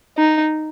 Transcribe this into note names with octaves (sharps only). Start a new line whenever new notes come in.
D#4